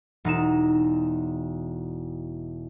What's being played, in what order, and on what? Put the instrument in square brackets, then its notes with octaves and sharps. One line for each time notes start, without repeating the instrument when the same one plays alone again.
[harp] E1 D#4 E7